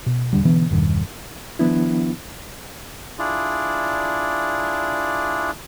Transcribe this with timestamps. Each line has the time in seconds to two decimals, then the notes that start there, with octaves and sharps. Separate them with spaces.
0.06 B2
0.33 E1 D3 G3
0.45 B2 D3 E3 B3
0.71 E1 G2 D#3
1.59 D#3 F3 B3 D4 E4
3.19 D4 E4 F4 G#4 D5